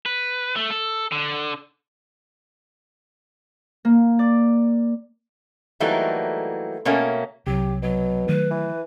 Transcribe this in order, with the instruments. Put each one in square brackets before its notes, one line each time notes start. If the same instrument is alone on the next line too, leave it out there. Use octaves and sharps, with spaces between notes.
[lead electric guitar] B4
A3
A4
D3
[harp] A#3
D5
[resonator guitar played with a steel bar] E3 F#3 G3 A3 A#3 D#4
B2 A3 A#3 C#4
[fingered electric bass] C2 [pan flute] F#3 [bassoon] G4
[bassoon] B2 [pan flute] F#3
[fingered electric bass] D#3 F#3 A3 [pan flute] B4
[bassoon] E3